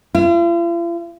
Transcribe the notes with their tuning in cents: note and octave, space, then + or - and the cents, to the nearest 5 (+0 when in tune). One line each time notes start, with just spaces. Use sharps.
F4 -45